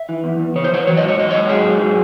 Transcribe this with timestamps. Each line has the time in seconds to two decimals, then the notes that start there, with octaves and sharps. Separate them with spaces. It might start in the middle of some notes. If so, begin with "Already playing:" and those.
Already playing: E5
0.09 E3
0.24 E2
0.39 E2
0.55 C#3 C#5
0.64 C5
0.71 E3 C#5
0.86 F#3 C#5
0.97 G#2 D#5
1.08 C#5
1.18 F#3 D#5
1.31 G#2 C#5
1.49 F#3 G#4
1.65 G#2
1.81 F#3